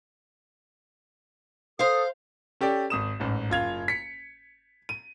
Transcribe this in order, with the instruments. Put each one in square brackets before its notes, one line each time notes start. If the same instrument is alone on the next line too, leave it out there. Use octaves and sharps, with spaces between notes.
[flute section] A4 D#6 [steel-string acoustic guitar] C5 F5
[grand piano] C#4 G4 A4 D5
G#1 D#6 E7
A1 G#2
F#1 F4 G#6 F7
B6 C#7
D#7